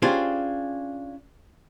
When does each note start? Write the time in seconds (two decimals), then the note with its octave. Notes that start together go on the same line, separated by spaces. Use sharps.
0.02 C#4 D4 F4 G4 G#4 C5